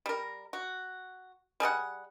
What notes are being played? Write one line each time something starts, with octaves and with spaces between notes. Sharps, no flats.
G3 A#4
F#4
G3 G#4 A#4 F#5